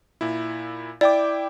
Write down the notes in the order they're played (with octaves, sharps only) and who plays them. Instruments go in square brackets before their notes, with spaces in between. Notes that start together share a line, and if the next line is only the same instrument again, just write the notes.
[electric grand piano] A#2 E4
[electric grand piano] E4 G5 D6 [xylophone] D5